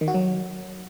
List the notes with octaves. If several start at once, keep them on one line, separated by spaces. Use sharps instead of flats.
D#3
F#4
F#3